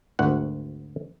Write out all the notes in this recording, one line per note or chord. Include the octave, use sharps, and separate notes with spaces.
G#1 D2 F#5